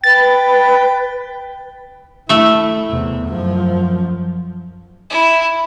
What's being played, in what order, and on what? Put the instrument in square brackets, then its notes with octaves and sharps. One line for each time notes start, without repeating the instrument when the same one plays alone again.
[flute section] B4 [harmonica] G5 [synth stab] A6
[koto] A3 E5 [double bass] E4
[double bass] E2 C3
F#2 F3
[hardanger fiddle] E4